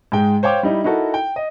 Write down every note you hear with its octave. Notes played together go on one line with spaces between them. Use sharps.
G#2 G#3 G5
C5 C#5 F5 G5 D6
G3 D#4 E4
D#4 E4 F#4 A4 A#4
G5
D#5